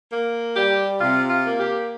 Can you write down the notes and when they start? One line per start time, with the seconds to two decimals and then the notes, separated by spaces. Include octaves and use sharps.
0.11 A#3
0.56 G3 G4
1.01 C3 F4
1.30 F4
1.45 A#3
1.59 G4